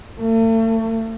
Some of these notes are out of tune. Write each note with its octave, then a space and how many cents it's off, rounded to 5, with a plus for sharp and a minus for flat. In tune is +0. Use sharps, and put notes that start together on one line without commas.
A3 +40